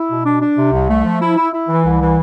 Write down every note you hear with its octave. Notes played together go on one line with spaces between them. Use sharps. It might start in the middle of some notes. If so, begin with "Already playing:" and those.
Already playing: E4
B2
D4
D4
C3
C2
A3
F3
E4
E4
E4
E3
C2
E3